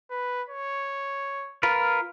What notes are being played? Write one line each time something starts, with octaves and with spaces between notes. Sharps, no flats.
B4
C#5
F4 A#4 B4